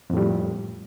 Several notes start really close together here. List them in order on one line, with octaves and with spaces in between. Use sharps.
F2 A2 G3